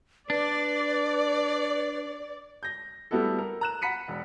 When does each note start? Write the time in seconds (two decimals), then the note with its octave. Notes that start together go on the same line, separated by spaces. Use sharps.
0.30 D4 B4 D5
2.63 G6 A#6
3.11 G3 A3 B3 E4 F#4 A4
3.39 A#4
3.61 A#5 F#6 E7
3.82 F#5 A#5 B5 B6 C#7 D#7
4.08 E1